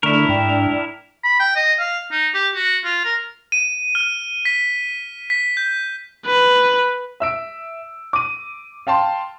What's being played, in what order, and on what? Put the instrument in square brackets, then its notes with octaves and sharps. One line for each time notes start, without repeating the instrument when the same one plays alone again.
[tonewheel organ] D3 A3 [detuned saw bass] D4 [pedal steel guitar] E4 A#4 [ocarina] C#6
[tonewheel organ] G#2 [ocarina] G5
[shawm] B5
G5
D#5
F5
D#4
G4
F#4
F4
A#4
[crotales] D#7
F6
B6
B6
G6
[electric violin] B4
[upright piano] E5 E6 D7
D6 D#7
F5 G5 A5 C6